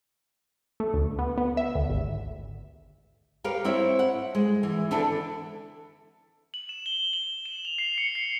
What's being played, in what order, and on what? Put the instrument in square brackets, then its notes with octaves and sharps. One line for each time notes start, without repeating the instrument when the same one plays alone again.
[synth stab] A3
D2
B3
B3
E5
D2
G#1
[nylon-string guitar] G4 A#4 B4 C#5 F5
C4 E4 C5 C#5
F#5
G#3
E3
D3 E3 D4 E4 A4 B4
[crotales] F#7
E7
G7
F#7
E7
F7
C7
C#7
C7